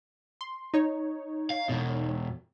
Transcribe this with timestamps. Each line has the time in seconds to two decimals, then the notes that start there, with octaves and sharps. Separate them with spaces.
0.41 C6
0.74 D#4 C#5
1.50 F5
1.69 E2 B2